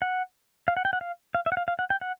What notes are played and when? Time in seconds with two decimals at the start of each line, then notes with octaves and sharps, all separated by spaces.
0.02 F#5
0.68 F5
0.77 F#5
0.85 G5
0.93 F#5
1.01 F5
1.35 F5
1.46 E5
1.52 F#5
1.57 F5
1.68 F5
1.79 F#5
1.90 G5
2.01 F#5